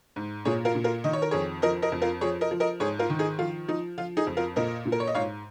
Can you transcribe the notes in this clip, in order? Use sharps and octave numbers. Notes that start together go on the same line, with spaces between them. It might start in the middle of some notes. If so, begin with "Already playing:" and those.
G#2
A#2 G#4 C#5
F4 A#4
A#2
F4 A#4
D#3 D#5
C#5
A#4
F2 G#4 C#5
F3 A#4 D#5
A#4 D#5
F2
F4 A#4
F3 G#4 C#5
A#4 D#5
F3
A#4 D#5
G#2 G#4 C#5
F4 A#4
D#3
D#4 G#4
F3 F4
F3 D#4
F3 F4
D#4 G#4
F2
F4 A#4
A#2 A#4 D#5
A#2
A#4
C#5
D#5
G#2 C#5 F5